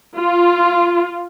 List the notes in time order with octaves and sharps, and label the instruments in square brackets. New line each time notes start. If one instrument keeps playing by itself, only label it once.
[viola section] F4